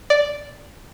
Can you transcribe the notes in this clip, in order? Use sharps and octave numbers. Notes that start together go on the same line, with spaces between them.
D5